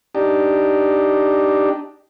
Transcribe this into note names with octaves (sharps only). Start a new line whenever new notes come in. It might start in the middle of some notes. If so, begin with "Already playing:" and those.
D4 D#4 G4